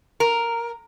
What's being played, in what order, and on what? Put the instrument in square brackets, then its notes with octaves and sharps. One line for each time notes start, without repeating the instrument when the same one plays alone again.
[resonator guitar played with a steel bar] A#4